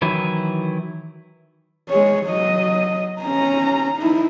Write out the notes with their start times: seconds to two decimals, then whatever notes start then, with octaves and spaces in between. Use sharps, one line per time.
0.02 D#3 E3 F#3 E4
1.89 G#3 C#5
2.26 F#3 D#5
3.22 C#4 A#5
3.98 D#4 E4